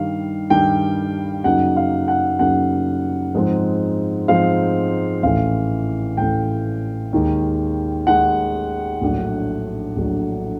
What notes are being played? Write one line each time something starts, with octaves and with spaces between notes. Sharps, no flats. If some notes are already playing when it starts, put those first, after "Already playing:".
Already playing: G2 D#3 G3 F5
G2 D#3 G3 G5
F#2 C#3 F#3 A#3 D#4 F#5
F5
F#5
F#2 C#3 F#3 A#3 D#4 F#5
G#2 F3 G#3 C4 D#4
G#2 F3 G#3 C4 D#4 F5
A1 A2 E3 F5
A1 A2 E3 G5
D#2 D#3 G#3
D#2 D#3 G#3 F#5
A#1 A2 F#3 A3 D4
A#1 A2 F#3 A3 D4